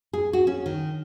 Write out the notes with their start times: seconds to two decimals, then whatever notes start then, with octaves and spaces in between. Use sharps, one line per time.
0.13 G#4
0.33 F#4
0.47 C#4
0.66 D#3